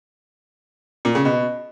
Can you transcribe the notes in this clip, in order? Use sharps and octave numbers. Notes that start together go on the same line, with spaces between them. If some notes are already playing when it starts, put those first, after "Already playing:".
A#2
C#3
B2